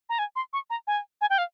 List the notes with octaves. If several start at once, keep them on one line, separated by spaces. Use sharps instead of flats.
A#5
G#5
C6
C#6
A#5
G#5
G#5
G5
F5